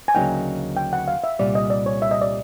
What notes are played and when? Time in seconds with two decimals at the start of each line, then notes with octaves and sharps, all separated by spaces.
0.08 G#5
0.15 D2 C#3 F#3 A#3 D#4 G5
0.77 G5
0.93 F#5
1.08 F5
1.24 E5
1.39 C2 A#2 G3 D5
1.55 D#5
1.70 D5
1.86 C#5
2.02 E5
2.11 D#5
2.21 D5